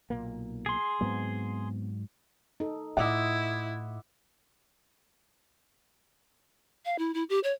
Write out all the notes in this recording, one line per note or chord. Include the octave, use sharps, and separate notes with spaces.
B1 A#2 A#3
G#4 C6
G#2 F#3 B3 C4
D#4 A4
A2 E4 F4 D#5 F#5 D6 E6
F5
E4
E4
G4
C#5